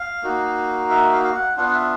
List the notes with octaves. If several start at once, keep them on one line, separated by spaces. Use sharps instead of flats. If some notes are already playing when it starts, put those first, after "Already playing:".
Already playing: F5
A#3 D#4 F#4
E5
F5
F5
F#5
B3 D4 F4 F#5
E5